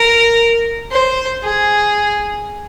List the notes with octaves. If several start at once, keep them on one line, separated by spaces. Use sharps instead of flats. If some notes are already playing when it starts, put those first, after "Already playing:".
Already playing: A#4
C5
G#4